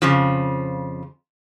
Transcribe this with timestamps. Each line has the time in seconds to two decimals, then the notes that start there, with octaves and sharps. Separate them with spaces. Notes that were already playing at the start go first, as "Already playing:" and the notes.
0.02 F2 C#3 F3